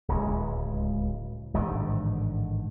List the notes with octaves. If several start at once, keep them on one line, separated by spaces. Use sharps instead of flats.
D1 C#2 G#3
A1 G#2 D3 D#3